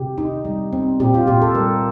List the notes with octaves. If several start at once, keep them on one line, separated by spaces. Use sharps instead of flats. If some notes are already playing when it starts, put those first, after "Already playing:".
Already playing: C3 G4
D#4
G3
C4
A#2 G4
F4
A#2 G4
A4
G3 A#4